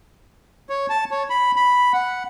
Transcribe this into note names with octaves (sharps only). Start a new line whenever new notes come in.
C#5
A5
C#5
B5
B5
F#5